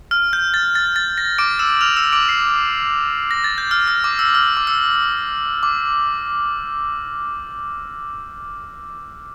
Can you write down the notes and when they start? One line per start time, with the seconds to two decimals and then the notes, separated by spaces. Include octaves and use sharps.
0.11 F6
0.33 G6
0.54 A6
0.75 A6
0.96 A6
1.18 A#6
1.38 D6 D7
1.59 E6 E7
1.81 F6 F7
1.96 E6 E7
2.12 D6 D7
2.29 C7
3.31 A#6
3.44 A6
3.58 G6
3.71 F6
3.88 F6
4.04 D6
4.19 E6
4.35 F6
4.57 D6
4.67 E6
5.63 D6